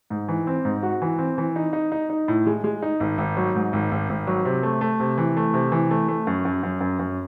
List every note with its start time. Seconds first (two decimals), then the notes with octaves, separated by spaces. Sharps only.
0.10 G#2
0.28 E3
0.47 C4
0.65 G#2
0.83 F#4
1.02 E3
1.19 C4
1.38 E3
1.56 D#4
1.73 D#4
1.92 D#4
2.10 D#4
2.28 A2
2.46 G#3
2.64 G#3
2.82 D#4
3.00 G#1
3.18 G#1
3.37 F#3
3.55 G#2
3.73 G#1
3.92 G#1
4.09 G#1
4.27 F#3
4.45 C3
4.63 A3
4.81 A3
5.00 C3
5.18 E3
5.37 A3
5.54 C3
5.72 E3
5.91 A3
6.08 A3
6.27 F#2
6.45 F#2
6.63 F#2
6.81 F#2
6.99 F#2